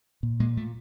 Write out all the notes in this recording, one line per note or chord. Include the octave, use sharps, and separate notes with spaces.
A#2
A#2 G#3
A#2 A3